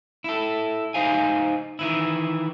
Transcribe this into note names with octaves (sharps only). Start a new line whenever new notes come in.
E4 A4
D#4 C5 F5 G#5
D#3 E3 E4